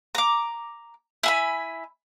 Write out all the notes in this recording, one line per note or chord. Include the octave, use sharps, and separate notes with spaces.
A#5 D6
E4 G#5 B5